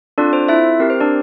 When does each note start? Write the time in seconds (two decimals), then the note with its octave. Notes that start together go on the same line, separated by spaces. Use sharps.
0.18 C4 D4 F4 A4 D5
0.33 C5
0.48 E4 E5
0.80 C4 G4 A#4
0.90 C5
1.01 D4 D5